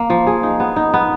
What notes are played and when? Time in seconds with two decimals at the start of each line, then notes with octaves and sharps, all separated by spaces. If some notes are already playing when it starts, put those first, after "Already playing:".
Already playing: A#3
0.10 F3
0.27 G#4
0.43 D#4
0.60 B3
0.76 D#4
0.94 B3